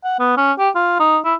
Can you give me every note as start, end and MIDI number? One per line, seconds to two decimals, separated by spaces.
0.04 0.19 78
0.19 0.34 59
0.37 0.52 61
0.58 0.69 67
0.75 0.98 65
1.00 1.18 63
1.24 1.34 64